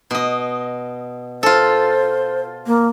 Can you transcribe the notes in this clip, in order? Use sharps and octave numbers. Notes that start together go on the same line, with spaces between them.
B2 D#5
F4 A4 C5
A#3